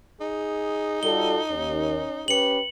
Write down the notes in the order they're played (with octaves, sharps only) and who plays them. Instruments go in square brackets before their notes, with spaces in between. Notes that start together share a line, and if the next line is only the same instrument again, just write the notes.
[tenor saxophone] D#4 [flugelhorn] G#4
[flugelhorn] G3 [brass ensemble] F4 F#4 A4 [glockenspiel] G7
[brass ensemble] D#2 [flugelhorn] C#4
[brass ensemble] C#4 G4 B4 [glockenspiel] C#7 F#7